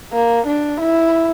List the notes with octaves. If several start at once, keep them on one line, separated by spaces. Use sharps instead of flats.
A#3
D4
E4